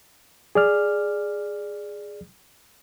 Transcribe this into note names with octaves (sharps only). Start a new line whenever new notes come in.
G#4 D5 F6